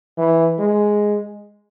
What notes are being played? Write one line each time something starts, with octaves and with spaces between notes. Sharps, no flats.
E3
G#3